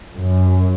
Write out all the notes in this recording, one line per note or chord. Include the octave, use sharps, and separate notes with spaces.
F#2